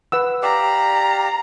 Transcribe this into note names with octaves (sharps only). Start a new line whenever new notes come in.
B4 F#5 E6
G4 D5 F5 A#5